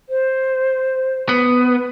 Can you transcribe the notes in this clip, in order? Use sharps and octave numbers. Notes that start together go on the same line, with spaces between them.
C5
B3